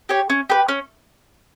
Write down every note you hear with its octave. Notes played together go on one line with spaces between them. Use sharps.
G4 C#5
C#4
G4 B4
C#4